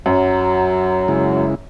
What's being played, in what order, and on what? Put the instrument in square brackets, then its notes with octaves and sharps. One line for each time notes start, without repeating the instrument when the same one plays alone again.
[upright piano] F#2 [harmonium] F#3
[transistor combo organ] C#3 G#3 E4